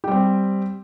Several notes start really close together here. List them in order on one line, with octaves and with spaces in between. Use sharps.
G4 G3 C4